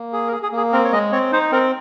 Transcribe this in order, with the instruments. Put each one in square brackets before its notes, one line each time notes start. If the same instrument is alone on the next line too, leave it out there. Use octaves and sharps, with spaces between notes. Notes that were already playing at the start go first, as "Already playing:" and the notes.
Already playing: [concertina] A#3
G#4
A#4
G#4
G#4
A#3
G#4
C4 A#4
C#5
G#3 D#5
C4 C#5
D#4 C5
C4 A#4